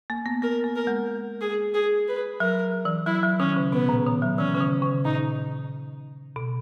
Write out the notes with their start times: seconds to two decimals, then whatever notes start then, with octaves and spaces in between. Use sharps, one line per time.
0.10 A#3
0.26 B3
0.42 B3 A#4
0.64 A#3
0.76 A#4
0.87 G#3
1.41 G#4
1.74 G#4
2.08 B4
2.40 F#3 A#4
2.85 E3
3.06 F#3 E4
3.23 F#3
3.40 D#3 C#4
3.56 C#3
3.72 B2 B3
3.89 A#2
4.06 D#3
4.22 F#3
4.38 E3 C#4
4.55 C#3
4.61 D#3
4.82 C#3
5.05 A#2 D#4
6.36 B2